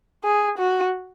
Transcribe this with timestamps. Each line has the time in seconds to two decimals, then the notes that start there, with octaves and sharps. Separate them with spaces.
0.24 G#4
0.58 F#4